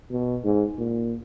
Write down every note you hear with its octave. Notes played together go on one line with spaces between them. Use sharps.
B2
G#2
A#2